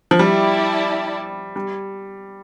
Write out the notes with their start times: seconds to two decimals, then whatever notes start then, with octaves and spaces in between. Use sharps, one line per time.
0.11 F3
0.19 G3 E4 G4 D5 A5
1.56 G3